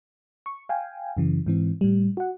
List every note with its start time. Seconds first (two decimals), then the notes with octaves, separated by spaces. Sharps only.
0.46 C#6
0.69 F5 G5 G#5
1.17 F#2 C#3 E3
1.46 G#2 E3 C4
1.81 A2 G3
2.17 F#4 F#5